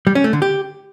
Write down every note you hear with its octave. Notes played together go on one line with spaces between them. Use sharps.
G3
C#4
A3
D3
G4